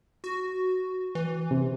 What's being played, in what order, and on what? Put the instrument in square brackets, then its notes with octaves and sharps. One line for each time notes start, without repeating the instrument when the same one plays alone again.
[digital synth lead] F#4
E3
[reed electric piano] C3